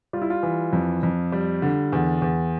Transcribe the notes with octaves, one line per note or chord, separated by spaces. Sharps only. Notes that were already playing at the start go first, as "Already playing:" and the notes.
G3 F4
E4
F4
E3
F2
F2
G3
D3
E2
E2